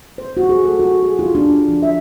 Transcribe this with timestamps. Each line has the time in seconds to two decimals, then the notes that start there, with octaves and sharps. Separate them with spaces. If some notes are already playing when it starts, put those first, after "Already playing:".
0.18 C5
0.37 F#4
0.49 G#4
0.64 A4
0.79 F#4
1.03 G#4
1.19 F4
1.35 D4
1.68 F3
1.82 E5